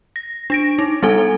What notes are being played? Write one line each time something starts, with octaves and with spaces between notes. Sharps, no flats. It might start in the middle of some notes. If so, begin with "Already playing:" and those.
A#6
D4 A#6 D7
D#4
G3 B3 A4 G#5